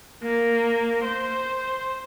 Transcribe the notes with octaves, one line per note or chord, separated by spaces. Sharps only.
A#3
C5